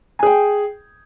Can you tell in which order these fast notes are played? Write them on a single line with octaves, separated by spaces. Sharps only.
G#5 G#4 G5